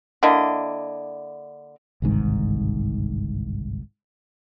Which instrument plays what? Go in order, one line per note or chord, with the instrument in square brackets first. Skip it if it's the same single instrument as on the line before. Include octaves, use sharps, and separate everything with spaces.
[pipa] D3 A#3 E4 D#5
[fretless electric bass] G1 C2 G#2 D#3